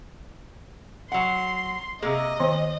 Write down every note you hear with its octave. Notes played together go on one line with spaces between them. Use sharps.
F#3 F#5 C6
C3 A#3 G#4 D#5
D#3 B3 C5